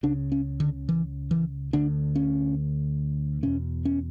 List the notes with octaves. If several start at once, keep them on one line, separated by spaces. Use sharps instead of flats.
C#2 C#3 D4
C#4
D3
E3
E3
D2 D3 D4
C#4
E2 B2 C#4
C#4